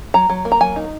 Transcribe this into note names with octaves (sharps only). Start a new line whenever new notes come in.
F#3 A#5
F#3
A#3
A#5
F#3 G#5
D#4